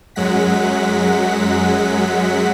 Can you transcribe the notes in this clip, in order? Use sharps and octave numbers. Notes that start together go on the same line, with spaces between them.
F#2 F#3 G#3 F#5 B6